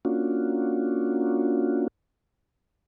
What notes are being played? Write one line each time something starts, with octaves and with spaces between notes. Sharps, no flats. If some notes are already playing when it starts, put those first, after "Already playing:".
A#3 C#4 D4 F4 F#4